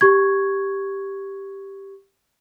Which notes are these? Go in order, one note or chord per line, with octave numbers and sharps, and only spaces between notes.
G4 C#6 G#6